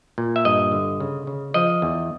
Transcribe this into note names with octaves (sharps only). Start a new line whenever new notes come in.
A#2
E5
G2 D#5
D3
C#3
C#3
F3 D#5
E2